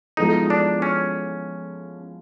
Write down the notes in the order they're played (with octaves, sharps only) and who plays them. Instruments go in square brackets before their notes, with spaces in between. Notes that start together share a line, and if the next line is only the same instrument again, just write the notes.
[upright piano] F3 G#3 B3 E4 A4 [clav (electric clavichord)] D#4
[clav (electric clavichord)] D4
C#4